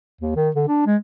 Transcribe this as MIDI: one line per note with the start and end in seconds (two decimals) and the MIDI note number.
0.21 0.34 39
0.36 0.50 51
0.55 0.63 50
0.68 0.81 62
0.86 0.96 56